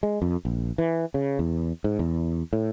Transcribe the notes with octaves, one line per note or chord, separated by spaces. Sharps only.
G#3
F2
A#1
E3
C#3
E2
G#2
E2
A2